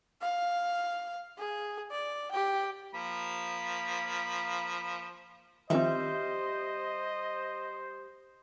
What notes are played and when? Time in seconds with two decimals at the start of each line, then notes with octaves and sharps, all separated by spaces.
0.22 F5
1.38 G#4
1.91 D5
2.31 G4 G5
2.94 F3 A#3 B5
5.70 D#3 F3 G3 C4 C5 D#5 E5